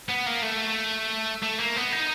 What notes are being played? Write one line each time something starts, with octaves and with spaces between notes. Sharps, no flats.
B3
A#3
A3
A3
A#3
B3
D#4